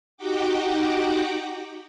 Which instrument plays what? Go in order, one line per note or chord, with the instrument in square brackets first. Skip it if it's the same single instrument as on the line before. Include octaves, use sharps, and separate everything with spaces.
[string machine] D#4 F#4 G4 F#5 G5 D6